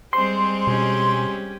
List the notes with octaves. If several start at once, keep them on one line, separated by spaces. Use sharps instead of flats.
G3 G#3 C4 C5 C6
B2 C#4 G4